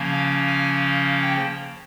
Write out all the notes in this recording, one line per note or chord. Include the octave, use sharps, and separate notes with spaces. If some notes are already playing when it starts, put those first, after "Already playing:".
Already playing: C#3 F3 A#3 C#4
F5
G#5
G5